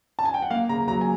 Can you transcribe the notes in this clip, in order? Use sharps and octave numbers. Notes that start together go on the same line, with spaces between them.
A5
G#5
G5
F#5
A#3 F5
C#3 A#5
F#3 A#5
G#5